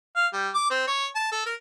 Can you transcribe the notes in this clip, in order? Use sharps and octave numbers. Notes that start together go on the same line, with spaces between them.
F5
G3
D6
C4
C#5
A5
A4
A#4